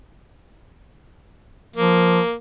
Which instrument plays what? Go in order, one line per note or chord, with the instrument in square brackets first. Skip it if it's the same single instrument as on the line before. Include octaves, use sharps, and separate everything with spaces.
[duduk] F3 [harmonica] A#3